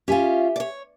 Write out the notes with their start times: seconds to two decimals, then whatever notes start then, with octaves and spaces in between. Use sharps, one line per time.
0.08 C#4 F4 G4 E5 G#5
0.56 C#5 D5